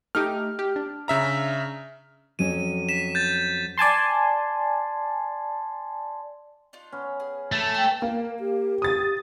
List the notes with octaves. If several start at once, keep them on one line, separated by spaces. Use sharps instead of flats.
A3 D#4 G4 F6
G4
D4
C#3 E5 A#5
F2 F#3 C#4 D#7
B6 E7
G6 A6
D5 G#5 A5 C6
D4 D#4 F4
B3 C#4
G#4
E3 A3 G#5 A5
G4
A#3 A#4
G4
D#6 A6